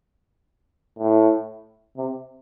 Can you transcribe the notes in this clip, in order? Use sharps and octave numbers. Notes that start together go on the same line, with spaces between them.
A2
C3